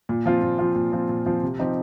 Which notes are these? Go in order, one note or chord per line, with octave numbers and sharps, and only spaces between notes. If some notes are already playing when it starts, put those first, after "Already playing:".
A#2
F3 C4 F4
A#2
F3 C4 F4
A#2
F3 C4 F4
A#2
F3 C4 F4
C3
F3 C4 D#4 G4